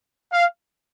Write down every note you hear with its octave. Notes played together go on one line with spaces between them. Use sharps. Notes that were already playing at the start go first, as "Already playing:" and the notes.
F5